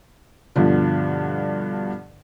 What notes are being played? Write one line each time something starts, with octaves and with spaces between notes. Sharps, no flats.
G2 B2 D3 F3